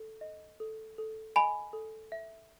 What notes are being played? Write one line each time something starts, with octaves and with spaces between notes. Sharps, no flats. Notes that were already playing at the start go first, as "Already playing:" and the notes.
Already playing: A4
D#5
A4
A4
D#5 G#5 B5
A4
E5